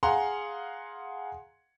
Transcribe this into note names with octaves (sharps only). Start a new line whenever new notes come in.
G#4 F5 F#5 A#5 C6